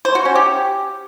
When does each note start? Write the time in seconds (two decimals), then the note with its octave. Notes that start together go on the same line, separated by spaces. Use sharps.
0.05 C5
0.15 F#4
0.25 C#4
0.35 G4